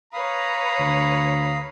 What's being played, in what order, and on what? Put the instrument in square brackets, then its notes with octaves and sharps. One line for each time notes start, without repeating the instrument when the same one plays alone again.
[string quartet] B4 C#5 [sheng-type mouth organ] F5 B5 D#6 [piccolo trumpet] A#5
[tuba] D2